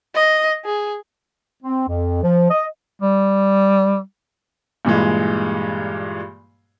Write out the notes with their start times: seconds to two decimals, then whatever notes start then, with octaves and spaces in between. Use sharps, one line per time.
0.15 D#5
0.65 G#4
1.63 C4
1.88 F2
2.23 F3
2.50 D#5
3.00 G3
4.85 G2 A#2 E3 G#3